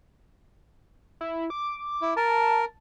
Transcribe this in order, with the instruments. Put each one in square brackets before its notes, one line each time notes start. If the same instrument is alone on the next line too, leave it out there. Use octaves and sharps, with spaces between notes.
[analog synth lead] E4
D6
[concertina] E4
[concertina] A#4 [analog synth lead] A5